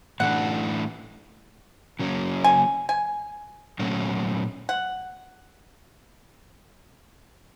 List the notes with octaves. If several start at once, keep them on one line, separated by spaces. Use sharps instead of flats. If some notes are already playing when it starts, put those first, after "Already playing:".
A2 E3 A3 D4 F#5
C#3 F#3 A#3 C#4
G#5
G#5
A#2 F#3 A3 C#4
F#5